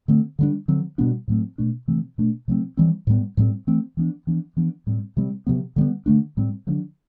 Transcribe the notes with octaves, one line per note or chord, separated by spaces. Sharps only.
D3 A3 C4
D3 G3 D4
D3 F#3 C4
B2 G3 B3 D4
A2 F#3 A3 C4
B2 A3 D4
C3 E3 A3 C4
B2 A3 D4
C3 F#3 A3 C4
E3 G3 C4
A2 G3 B3
A2 G3 C4
E3 A3 C4
E3 B3 D4
E3 B3 D4
E3 B3 D4
A2 G3 C4
C3 G3 C4
C3 F#3 B3
D3 G3 B3
D3 A3 D4
A2 G3 C4
D3 F#3 A3 D4